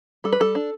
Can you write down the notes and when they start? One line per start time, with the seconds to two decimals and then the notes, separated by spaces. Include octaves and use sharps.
0.24 G3 A4
0.32 B4
0.40 G3 A4
0.55 D4